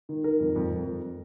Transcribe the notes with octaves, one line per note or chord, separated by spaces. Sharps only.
D#3
D#3 A#4
F2
F2
F2
F2